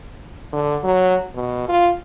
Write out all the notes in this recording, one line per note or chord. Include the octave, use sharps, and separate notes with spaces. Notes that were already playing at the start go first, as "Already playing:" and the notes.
D3
F#3
B2
F4